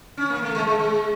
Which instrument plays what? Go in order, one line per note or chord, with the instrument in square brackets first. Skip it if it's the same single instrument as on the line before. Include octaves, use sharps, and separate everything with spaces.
[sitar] C#4
A#3
A3
G#3
G#3
G#3